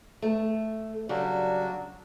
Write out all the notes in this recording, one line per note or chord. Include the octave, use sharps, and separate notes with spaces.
A3
C#3 F#3 G3 D4 F#4